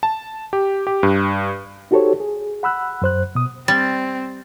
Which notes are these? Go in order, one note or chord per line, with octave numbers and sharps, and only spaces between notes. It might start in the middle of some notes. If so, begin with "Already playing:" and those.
A5
G4
G4
G2
D#4 F#4 G4 A4 C5 C#5
G#4
F#5 B5 E6 F#6
F#2 C5 F#6
B2 D#6
G3 C4 A6